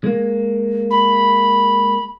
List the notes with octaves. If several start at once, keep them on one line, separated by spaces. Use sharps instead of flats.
G#3 A#3
B5